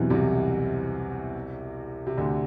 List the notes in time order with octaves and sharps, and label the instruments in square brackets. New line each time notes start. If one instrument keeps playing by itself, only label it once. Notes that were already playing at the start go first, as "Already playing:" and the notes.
Already playing: [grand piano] E2 E3 [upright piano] B2 F#3 C4 E4 G4
[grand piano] C2 C3
C3
D2 D3